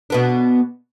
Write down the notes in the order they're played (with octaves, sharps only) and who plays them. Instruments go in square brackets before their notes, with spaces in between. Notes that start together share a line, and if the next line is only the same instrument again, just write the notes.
[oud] B2 B3 D4